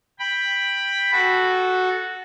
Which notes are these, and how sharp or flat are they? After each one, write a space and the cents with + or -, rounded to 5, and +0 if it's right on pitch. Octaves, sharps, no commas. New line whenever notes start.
G5 +10 B5 +0
F#4 +0 A4 -15